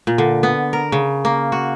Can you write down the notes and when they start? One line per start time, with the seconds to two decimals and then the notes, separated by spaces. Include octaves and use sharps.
0.07 A#2
0.18 D3
0.43 B3
0.73 A#4
0.92 C#3
1.25 A#3
1.52 F#4